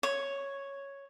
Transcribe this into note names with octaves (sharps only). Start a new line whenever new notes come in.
C#5